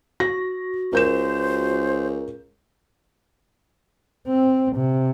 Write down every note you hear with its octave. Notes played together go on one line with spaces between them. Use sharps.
F#4 A#6
C#2 A#4 C5 G6 E7
C4
C3